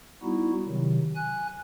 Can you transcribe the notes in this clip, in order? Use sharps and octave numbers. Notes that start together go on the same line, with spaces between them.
G3 B3 D#4 E4 F#4
C3 D#3 F#3
G#5 F#6